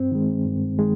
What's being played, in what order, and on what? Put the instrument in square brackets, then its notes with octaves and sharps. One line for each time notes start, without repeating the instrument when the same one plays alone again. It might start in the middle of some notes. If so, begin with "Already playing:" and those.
Already playing: [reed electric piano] G2 C4
D#3 G#3
G2
D#3 G#3